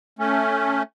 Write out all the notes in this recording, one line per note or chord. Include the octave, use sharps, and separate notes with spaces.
A3 C#4